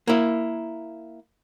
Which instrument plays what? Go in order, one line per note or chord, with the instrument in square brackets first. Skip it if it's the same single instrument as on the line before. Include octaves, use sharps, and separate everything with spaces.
[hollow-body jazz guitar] A#3 E4